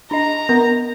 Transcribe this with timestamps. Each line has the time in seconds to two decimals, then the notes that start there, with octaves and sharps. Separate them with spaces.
0.11 D4 D#5 A#5
0.49 B3 A#4